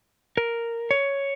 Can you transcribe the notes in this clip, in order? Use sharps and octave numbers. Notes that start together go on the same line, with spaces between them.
A#4
C#5